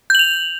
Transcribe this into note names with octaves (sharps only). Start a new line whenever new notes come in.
G6 F7 F#7